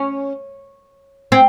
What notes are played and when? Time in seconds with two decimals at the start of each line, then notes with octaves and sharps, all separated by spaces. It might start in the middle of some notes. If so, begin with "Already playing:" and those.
Already playing: C#4
1.32 C4